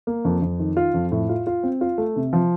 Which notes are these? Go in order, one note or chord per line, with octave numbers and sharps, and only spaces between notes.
A#3
F2
F2
D#3
F4
F2
A2
F4
F4
C4
F4
A3
C3
F3